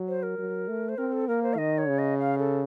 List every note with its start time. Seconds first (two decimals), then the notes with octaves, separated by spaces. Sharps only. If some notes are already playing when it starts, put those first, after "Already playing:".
Already playing: F#3
0.08 C5
0.23 A#4
0.38 F#3
0.68 A3
0.89 C5
0.98 C4 A#4
1.13 A4
1.28 A#3 A#4
1.43 C5
1.54 F5
1.58 D#3 D#5
1.78 C#5
1.88 C#3
1.99 D#5
2.18 F5
2.39 A4